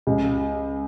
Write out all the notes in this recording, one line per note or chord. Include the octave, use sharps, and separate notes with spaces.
C#2